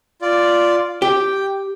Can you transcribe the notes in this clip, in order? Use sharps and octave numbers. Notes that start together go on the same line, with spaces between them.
F4 D5
G4 G5